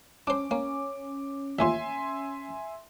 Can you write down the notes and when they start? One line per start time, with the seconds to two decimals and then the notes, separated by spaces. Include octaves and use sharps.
0.27 C#4 D4 C5 D6
0.51 A#3 C#4
1.59 A1 D#2 A#2 E5 G#5 C6